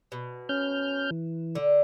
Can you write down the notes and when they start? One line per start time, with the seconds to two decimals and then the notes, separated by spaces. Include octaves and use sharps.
0.12 B2
0.49 C#4 F6 G6
1.11 E3
1.55 D3